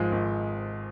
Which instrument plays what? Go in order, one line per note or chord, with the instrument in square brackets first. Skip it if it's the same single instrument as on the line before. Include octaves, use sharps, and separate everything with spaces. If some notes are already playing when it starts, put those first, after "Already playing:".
Already playing: [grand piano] G#1 G#2 G#3 F4 [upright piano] F3
[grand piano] G#1